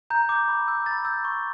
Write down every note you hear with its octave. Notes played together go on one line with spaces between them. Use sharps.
A#5 G6
D6 G6
B5
E6 G6
B5 A6
E6 G6
C#6